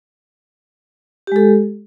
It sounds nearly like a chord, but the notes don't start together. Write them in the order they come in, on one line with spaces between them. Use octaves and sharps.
G4 G#3 A4